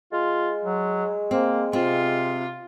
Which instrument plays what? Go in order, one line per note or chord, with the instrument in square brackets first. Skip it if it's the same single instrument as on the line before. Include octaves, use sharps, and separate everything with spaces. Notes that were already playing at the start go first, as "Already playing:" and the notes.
[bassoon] G#3 [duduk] F4
[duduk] F#3
[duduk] A#3 [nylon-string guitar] C4
[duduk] C3 [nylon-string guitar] C4 [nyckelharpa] F4